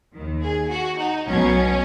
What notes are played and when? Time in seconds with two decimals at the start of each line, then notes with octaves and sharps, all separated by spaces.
0.14 D#2 D#3
0.43 G#4
0.70 F#4
0.99 D#4
1.26 B1 B2 C#4